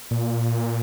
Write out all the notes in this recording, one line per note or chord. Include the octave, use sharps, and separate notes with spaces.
A#2